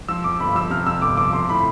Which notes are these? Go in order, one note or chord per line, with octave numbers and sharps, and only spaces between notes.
F3 E6
F2 D6
G1 B5
F3 E6
C3 F6
F2 E6
G1 D6
F3 D6
C3 C6
A2 B5